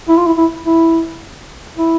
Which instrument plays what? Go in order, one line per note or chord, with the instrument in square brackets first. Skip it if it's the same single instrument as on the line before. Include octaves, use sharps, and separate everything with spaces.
[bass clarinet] E4
F4
E4
E4
E4
E4